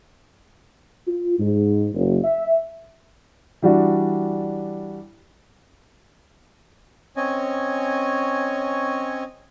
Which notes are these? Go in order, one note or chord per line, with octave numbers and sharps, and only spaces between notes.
F4
G#2
F#1
E5
E3 G3 D4 F#4
C4 C#4 C#5 D#5 G#5